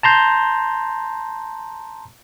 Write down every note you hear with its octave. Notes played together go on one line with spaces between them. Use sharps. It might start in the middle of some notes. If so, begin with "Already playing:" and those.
A5 A#5 C6 G6